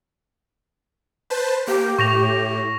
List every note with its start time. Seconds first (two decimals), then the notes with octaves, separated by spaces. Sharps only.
1.30 B4 C5 A5
1.68 A#3 G4
1.98 A2 C#6 A#6 F7